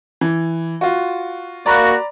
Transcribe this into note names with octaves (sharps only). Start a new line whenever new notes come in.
E3
F4 F#4
A#3 F#4 D5 A#5 B5